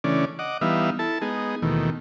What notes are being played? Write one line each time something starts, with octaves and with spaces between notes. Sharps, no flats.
C#3 E3 A3 C#4 D4 D5
D#5 F#5 D6
E3 G3 B3 D#4 E5 F5
E4 A4 A5
G#3 B3 D#4 G#4
D#2 B2 D#3 E3 A3